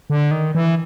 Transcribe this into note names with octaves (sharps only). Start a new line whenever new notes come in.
D3
D#3
E3